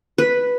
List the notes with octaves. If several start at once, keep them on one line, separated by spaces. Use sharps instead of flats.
B4